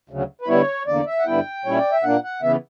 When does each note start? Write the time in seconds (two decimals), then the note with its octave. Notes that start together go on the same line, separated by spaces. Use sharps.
0.09 D2 C#3 F#3
0.41 B4
0.48 D3 G3 B3 E4 C#5
0.87 E2 D3 A#3 D5
1.07 E5
1.19 F#5
1.26 G2 D3 G3 B3 E4 G5
1.65 A#2 G3 C#4 E4 C#5
1.78 D5
1.92 E5
2.03 A#2 A#3 D4 F#5
2.24 F#5
2.42 C#3 E3 B3 E5